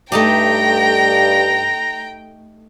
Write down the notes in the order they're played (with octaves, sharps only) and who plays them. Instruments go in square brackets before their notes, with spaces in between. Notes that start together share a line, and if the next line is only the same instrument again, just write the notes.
[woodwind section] G2 [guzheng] A3 D#4 G4 [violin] G5 [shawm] A#5